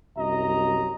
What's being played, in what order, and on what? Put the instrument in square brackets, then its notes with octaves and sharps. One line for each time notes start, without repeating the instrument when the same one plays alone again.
[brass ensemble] C2 F#2 F#3 D#5 A#5